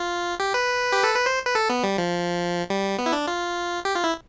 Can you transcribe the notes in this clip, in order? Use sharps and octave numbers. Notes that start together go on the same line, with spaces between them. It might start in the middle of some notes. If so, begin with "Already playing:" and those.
Already playing: F4
G4
B4
G4
A4
B4
C5
B4
A4
B3
G3
F3
G3
B3
E4
D4
F4
G4
F4
E4